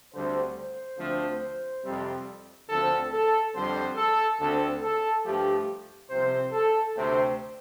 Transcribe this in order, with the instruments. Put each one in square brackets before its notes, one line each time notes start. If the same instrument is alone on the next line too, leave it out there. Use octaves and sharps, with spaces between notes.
[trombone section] D2 D3 G3 C4 C5
C5
D2 D3 F3 A3 C4
F2 C3 G3 C4
D2 D3 F3 C4 A4
A4
F2 D3 G3 C4 C5
A4
D2 D3 A3 C4 A4
A4
G2 F3 A3 G4
C2 C3 F3 C4 C5
A4
D2 C3 A3 C4 C5